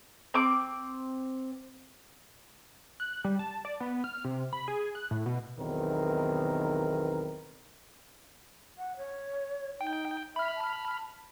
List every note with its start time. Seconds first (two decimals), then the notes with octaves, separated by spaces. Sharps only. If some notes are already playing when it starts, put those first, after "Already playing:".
0.34 C4 D6
3.00 F#6
3.25 G3
3.39 A5
3.65 D5
3.80 B3
4.04 F6
4.25 C3
4.53 B5
4.68 G#4
4.95 F#6
5.11 A2
5.26 B2
5.58 B1 E2 D#3 C4 A#4 B4
8.78 F#5
8.97 C#5
9.81 D#4 G5
10.36 E5 B5 F6
10.56 A5